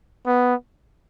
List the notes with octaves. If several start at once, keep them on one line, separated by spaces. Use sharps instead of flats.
B3